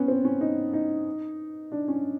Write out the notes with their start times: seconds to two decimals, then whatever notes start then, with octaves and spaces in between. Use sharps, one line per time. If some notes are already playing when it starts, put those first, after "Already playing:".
Already playing: B3 C#4
0.08 C4
0.25 C#4
0.41 D#4
0.73 D#4
1.72 D4
1.88 C#4